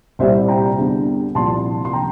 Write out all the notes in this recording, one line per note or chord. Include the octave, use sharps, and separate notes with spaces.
C2 A#2 G3 C5 E5
G5 A#5
E2 D3 G3
C2 A#2 F3 A5 C6
C6
D3 F3 G5 A#5